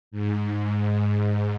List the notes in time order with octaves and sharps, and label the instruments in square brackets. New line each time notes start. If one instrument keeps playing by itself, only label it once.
[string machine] G#2